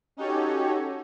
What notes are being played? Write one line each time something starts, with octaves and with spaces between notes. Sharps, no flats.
C#4 D#4 F#4 G4 A4 C#5